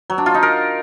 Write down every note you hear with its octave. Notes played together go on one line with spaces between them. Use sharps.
F#3
D4
F4
D#4
A#4